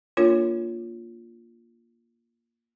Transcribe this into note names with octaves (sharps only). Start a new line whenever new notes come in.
A#3 D4 F4 A#4 C#5